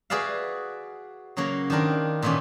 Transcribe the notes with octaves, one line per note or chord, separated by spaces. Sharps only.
F#4 G#4 B4 D5 E5 F5
C#3 F#3 A#3 C#5 A#5
D#3 C4 D4 A#4
A#2 D#3 E3 B3 C#4